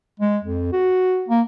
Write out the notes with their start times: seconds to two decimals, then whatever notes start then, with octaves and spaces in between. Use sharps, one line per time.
0.20 G#3
0.44 F2
0.73 F#4
1.28 A#3